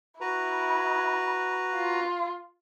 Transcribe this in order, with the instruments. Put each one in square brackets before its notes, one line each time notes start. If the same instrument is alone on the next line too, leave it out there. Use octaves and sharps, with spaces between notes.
[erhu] E4 [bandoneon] F#4 B4 A#5
[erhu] F4